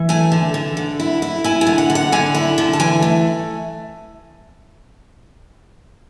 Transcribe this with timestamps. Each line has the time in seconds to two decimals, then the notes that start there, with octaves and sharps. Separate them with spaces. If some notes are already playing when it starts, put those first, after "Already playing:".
Already playing: E3
0.09 A3 G#5
0.32 D3
0.54 D3
0.77 D3
1.00 E4
1.22 E4
1.44 E4 G#5
1.61 G#5
1.67 D3
1.78 F#5
1.90 D3
1.95 F#5
2.12 D3 G#5
2.35 E4
2.58 D3
2.73 A5
2.80 E3 G#5
3.02 A3